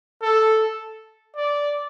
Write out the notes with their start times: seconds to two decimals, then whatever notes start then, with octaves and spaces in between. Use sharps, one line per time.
0.22 A4
1.36 D5